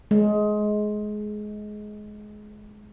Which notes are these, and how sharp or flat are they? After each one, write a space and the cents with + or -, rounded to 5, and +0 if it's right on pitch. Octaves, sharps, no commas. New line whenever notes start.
G#3 +20